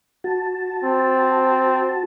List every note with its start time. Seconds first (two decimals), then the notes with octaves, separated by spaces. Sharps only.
0.24 F#4 A5
0.83 C4